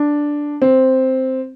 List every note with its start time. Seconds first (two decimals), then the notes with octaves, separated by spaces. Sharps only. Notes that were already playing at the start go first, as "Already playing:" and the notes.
Already playing: D4
0.62 C4